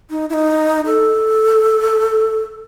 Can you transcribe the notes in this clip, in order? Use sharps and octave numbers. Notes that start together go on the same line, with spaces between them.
D#4
E4
D#4
A4